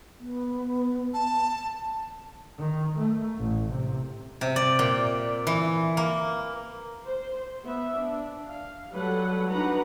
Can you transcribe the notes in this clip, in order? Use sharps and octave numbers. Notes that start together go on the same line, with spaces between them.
B3
A5
D#3
A3
A1
C3
C3
D5
A#2
E3
A#3
C5
B3 E5
D4
F5
F#3 G3 A4 B4 F#5
D4 D#4 F#4 B4 F#5 A#5